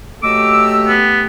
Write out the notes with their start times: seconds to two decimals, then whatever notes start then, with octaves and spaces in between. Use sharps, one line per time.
0.23 F#3 A3 G4 D#5 D6 E6
0.88 B3